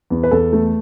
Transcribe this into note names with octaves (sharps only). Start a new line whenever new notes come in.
E2
B4
E2 A4
A3